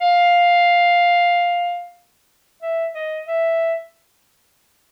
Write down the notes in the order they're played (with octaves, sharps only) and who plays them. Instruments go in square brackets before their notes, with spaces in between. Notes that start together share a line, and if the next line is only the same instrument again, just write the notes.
[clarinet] F5
E5
D#5
E5